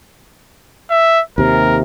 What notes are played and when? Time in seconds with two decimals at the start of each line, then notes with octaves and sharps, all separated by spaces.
0.90 E5
1.38 D#2 C3 A#4